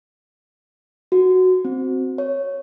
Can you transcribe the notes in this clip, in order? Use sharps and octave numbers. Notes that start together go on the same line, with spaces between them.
F#4
C4
C#5